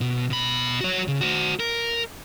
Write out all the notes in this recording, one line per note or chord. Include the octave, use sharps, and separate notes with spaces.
B2
B2 B5
F#4 C#5
C#3
F#4 C5
A#4